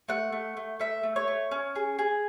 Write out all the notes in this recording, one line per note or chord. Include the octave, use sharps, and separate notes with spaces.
A3 F#5
A3
A3
A3 E5
A3
C#5
A3
C#4
G#4
G#4